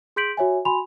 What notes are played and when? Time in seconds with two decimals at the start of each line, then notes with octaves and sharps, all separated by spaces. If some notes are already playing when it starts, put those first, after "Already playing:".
0.16 G#4 C6 G6 B6 D7 F#7
0.37 F#4 C#5 E5 G#5
0.65 F#4 G#5 B5 C6 F7